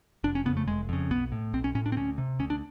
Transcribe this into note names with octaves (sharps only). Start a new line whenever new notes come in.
F1 D4
C#4
F2 C#3 B3
A3
F1 G#3
F2 C#3
B1 B3
A2
B1 C4
C#4
A2 C#4
D4
C4
D2 C#4
C3
D2 C#4
D4